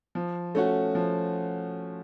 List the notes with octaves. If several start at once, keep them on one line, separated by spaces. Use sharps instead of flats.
F3
A3 C#4 F#4
F3